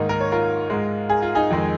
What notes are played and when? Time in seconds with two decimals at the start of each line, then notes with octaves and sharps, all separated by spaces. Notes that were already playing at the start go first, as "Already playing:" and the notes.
Already playing: G#2 D#3 A#3 D#4
0.09 A#4
0.21 C#5
0.32 F4 A#4
0.70 G#2 G#3
1.10 G#4
1.22 F4
1.35 D#4 G#4
1.50 F2 D#3 G#3